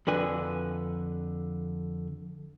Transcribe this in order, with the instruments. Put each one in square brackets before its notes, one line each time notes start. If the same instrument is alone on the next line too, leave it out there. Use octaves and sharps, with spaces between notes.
[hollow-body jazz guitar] F2 D3 B4 G#5